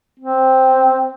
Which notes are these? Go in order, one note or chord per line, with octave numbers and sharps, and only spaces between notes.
C4